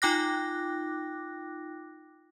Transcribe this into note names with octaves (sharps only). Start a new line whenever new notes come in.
D#4 F4 G5 D6 F#6 A#6